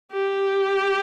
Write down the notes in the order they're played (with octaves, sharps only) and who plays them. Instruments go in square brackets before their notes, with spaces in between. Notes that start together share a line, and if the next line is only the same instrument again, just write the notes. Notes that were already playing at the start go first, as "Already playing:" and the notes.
[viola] G4